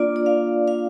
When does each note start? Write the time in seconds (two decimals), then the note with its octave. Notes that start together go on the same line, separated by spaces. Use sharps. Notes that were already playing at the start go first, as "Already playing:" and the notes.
Already playing: A#3 D4 F4 D5
0.16 D5
0.26 F5
0.68 F5